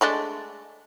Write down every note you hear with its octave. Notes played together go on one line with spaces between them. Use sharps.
G#3 A3 D4